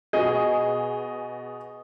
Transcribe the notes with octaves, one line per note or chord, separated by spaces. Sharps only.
B2 G#4 D#5